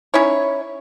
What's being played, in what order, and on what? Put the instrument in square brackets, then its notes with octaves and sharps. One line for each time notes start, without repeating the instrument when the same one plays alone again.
[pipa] C#4 D#4 E4 C#5